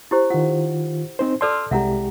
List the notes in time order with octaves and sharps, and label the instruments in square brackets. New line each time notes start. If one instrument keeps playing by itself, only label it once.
[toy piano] E4 G4 C5
[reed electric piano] D#3 F4 [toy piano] F#5
[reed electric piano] C4 D#4 C5
[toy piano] A4 D5 A5 [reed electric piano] C6 E6 F6
[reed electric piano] C2 G#3 G4 [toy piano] E5 F#5 A#5